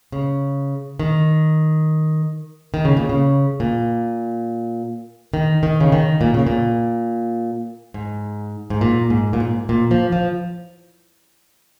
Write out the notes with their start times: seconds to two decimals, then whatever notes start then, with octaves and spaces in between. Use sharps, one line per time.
0.12 C#3
0.99 D#3
2.74 D#3
2.85 C#3
2.97 A#2
3.09 C#3
3.60 A#2
5.34 D#3
5.63 D#3
5.81 C#3
5.92 D#3
6.21 A#2
6.34 C#3
6.47 A#2
7.94 G#2
8.70 G#2
8.81 A#2
9.10 G#2
9.33 A#2
9.40 G#2
9.69 A#2
9.91 F3
10.12 F3